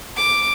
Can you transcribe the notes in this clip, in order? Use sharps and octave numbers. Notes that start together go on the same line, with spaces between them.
D6